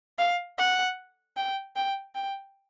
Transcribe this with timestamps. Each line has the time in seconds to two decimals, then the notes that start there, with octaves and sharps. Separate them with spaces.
0.19 F5
0.58 F#5
1.37 G5
1.76 G5
2.15 G5